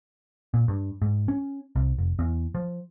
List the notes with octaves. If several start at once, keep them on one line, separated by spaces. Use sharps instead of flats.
A#2
G2
G#2
C#4
C2
F1
E2
F3